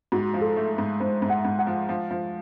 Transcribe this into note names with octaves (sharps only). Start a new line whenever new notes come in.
G#2 F#4
F3
A4
A3
G#2
G#2 C5
G#2
F#5
G#2
F#5
F3
F3
F3